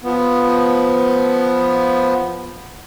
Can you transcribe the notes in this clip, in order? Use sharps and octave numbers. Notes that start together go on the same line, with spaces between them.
F3 B3